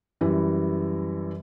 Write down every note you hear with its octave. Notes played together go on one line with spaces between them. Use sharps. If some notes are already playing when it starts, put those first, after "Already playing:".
F#2 E3 G3 E4